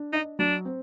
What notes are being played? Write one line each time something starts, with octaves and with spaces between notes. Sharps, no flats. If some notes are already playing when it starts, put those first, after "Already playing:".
Already playing: D4
D#4 D#5
F#3 D4
C4